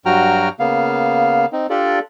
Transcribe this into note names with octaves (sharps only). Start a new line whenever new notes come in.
G2 F#3 F#4 G5 A#5 F6
C#3 A#3 B3 F5
C4 D#4
D4 F4 G4 A4 D5